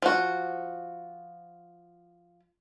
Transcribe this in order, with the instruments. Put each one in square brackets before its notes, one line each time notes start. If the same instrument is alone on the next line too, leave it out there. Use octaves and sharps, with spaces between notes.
[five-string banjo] F3 F#4